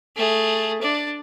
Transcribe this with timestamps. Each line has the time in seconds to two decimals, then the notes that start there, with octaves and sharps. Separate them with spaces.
0.17 A3 G#4
0.82 D4 D5